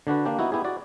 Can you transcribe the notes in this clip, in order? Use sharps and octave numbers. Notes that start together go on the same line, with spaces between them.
D3 D4 F#4 B4
A#3 D4 G4
B3 D#4 E4 F#4
B3 E4 G4 G#4
F#4 D5